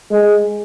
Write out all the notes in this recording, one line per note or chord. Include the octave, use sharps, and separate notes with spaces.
G#3